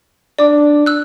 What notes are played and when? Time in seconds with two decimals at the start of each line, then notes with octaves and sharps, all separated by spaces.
0.39 D4 D5 D6
0.86 E6 F#6